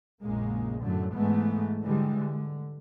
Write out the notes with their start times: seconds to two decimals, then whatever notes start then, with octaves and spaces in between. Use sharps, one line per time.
0.23 A#1 F#2 C#3 G#3 A#3
0.80 F#2 A2 D3 F#3 A3
1.13 G#2 E3 G#3 A3 B3
1.82 D3 E3 G3 G#3
2.17 D3